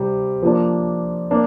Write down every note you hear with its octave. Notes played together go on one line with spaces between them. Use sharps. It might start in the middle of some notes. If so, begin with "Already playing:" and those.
Already playing: C3 G3 C4
F3 A#3 D4
A#3 D4